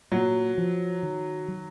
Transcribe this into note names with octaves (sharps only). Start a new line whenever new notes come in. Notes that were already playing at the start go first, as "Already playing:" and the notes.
A#2 F#3
F3
D#3
F#3